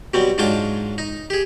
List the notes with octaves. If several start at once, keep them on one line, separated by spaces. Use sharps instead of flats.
B2 F#3 G3 C4
G#2 F#3 D4 F4 G5 D6
D#4
G4 G#4